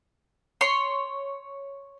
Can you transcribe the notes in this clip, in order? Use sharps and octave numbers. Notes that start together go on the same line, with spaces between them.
C#5 C6